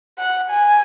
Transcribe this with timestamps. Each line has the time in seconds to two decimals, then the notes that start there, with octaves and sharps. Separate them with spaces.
0.19 F#5
0.50 G#5